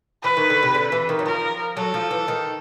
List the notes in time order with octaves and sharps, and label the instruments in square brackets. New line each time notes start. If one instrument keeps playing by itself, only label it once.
[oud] E3 [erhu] B4
[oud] D#3
D3
C3
D3
E3
D#3
F#3
[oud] F3 [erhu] A#4
[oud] F#3 [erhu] A4
[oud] F3
E3
D#3